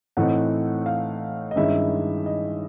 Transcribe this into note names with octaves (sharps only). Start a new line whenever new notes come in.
A2 E3 A3 C4 D#4 F#5
F5
D#5
G2 D#3 G#3 C#4 E4 E5
D#5